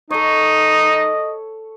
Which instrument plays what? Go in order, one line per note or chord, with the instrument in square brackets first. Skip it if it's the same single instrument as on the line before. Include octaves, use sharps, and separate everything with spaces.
[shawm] D#4 [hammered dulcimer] A4 C#5 [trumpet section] D#5